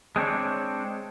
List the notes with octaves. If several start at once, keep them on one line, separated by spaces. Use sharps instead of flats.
G#3 C4 D4 C#5